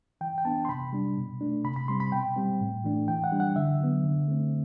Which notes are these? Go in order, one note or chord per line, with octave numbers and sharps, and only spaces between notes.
E3 G5
G5
B3 D4 A5
C6
C3 B5
G3 D4
B2
A3 D4
C3 B5
B5
G3 C4 C6
B5
B2 G5
G3 C4
A2
E3 A3 D4
E3 G5
F#5
G3 D4
F#5
D3 E5
F#3 B3
D3
A3 C4